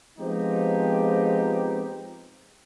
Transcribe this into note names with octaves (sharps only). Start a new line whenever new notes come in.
F3 G#3 B3 C4 D#4 G4